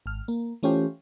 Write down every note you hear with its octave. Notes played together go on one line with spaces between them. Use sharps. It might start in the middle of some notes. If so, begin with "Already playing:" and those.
G#1 F6
A#3
E3 A3 C#4 F4 G4 C5